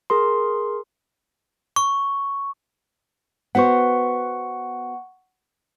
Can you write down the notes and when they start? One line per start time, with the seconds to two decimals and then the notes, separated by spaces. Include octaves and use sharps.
0.10 G#4 A#4 C6
1.76 C#6
3.55 B3 F#4 C5 F#5 C#6